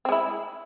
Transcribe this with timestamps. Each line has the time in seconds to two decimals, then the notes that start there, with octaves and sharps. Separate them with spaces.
0.05 C4
0.09 G#3
0.12 E4